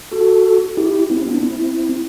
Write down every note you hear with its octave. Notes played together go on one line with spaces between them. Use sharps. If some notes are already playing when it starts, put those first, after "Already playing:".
F#4 A4
E4 G4
C4 E4
B3 D4
C4 E4